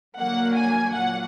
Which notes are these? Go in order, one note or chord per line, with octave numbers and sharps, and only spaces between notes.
D3 F#3 A#3 F#5
G#5
A#2 F#3 A#3 F#5